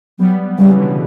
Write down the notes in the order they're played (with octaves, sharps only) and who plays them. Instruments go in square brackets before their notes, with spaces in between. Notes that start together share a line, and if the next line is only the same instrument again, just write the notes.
[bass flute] F#3 [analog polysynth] G3 B3
[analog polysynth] C#3 E3 [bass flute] G3
[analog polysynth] B2 D3